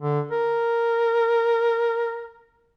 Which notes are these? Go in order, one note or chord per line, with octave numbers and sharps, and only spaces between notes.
D3
A#4